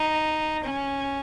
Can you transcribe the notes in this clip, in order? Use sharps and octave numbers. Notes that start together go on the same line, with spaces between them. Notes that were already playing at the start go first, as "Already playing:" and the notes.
Already playing: D#4
C#4